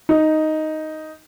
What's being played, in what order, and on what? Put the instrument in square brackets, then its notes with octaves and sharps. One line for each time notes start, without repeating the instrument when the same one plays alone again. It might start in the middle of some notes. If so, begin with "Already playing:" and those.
[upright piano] D#4